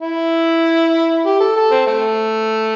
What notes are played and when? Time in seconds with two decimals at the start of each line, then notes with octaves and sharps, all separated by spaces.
0.01 E4
1.25 G4
1.40 A4
1.56 A4
1.71 C4
1.87 A3